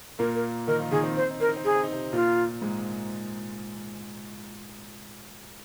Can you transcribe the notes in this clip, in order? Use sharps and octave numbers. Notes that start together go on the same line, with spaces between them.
A#2 A#3 A#4
A#4
D#3 D#4 A#4
F3 F4
D#3 D#4 G#4
C4
D#4 C5
C4
D#4
C4 A#4
D#4
C4
D#4 G#4
C4
D#4
C3 C4
A#2 A#3 F4
G#2 G#3